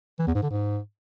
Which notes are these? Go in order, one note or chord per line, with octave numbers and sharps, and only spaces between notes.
E3
E2
G#2
D3
G#2